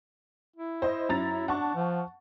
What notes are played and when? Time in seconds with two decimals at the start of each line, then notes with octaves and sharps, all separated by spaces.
0.56 E4
0.82 C5 D#5
1.09 F#2 A#5 A6
1.48 D4 F#5 A5 C#6
1.75 F3